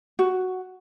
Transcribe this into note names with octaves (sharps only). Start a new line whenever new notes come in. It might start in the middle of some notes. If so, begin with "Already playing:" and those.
F#4